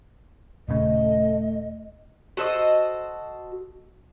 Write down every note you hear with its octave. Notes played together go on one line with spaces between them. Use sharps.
D#1 C#3 A3 D#5
F#4 A4 C5 D#5